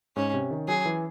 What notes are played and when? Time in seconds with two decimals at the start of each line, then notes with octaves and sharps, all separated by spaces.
0.16 G#2 C#4
0.33 C3
0.51 D#3
0.68 F#3 G#4
0.86 E3